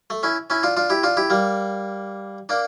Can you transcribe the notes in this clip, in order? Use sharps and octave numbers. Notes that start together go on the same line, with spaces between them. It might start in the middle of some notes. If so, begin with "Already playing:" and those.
A3
C#4 E4
C#4 E4
D4 F4
D4 F4
E4 G4
D4 F4
E4 G4
G3 A#3
A#3 D4